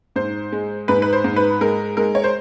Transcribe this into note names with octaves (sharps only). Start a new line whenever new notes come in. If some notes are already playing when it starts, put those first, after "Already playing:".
G#2 C5
G#3
G#2 B4
B4
C5
G#2
B4
G#3 A#4
G#3 A#4
C#5
C5